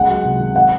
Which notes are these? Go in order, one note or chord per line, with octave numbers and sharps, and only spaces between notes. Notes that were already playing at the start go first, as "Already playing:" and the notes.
Already playing: C#2 G#3 F#5
F#3
C3
D#3
F#5